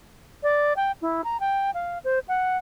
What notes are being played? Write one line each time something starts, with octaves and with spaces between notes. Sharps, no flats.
D5
G5
E4
A#5
G5
F5
C5
F#5